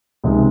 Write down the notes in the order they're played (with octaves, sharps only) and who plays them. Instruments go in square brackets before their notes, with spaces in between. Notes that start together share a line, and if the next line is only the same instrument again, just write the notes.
[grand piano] C#2 C3 D#3 G#3 C4